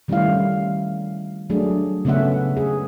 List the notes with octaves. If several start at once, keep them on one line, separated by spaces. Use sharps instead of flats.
D#3 G3 A3 C#4 E4 F5
F#3 A3 D4 G#4
C#3 A3 B3 C#4 E5 F#5
G#4